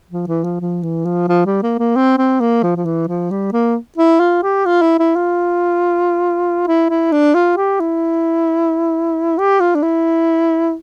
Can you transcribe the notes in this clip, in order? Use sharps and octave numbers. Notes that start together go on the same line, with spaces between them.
F3
E3
F3
F3
E3
F3
F3
G3
A#3
A#3
C4
C4
A#3
F3
F3
E3
F3
G3
A#3
E4
F4
G4
F4
E4
E4
F4
E4
E4
D4
F4
G4
E4
G4
F4
D4
E4